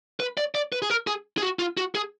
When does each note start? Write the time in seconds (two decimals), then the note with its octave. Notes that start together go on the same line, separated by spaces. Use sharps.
0.20 B4
0.37 D5
0.55 D5
0.72 B4
0.82 G#4
0.90 A#4
1.07 G#4
1.38 G#4
1.42 F#4
1.59 F4
1.77 F#4
1.95 G#4